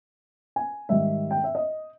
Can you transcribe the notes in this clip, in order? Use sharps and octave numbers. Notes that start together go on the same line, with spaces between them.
G#5
G#2 D#3 G3 E5
G5
E5
D#5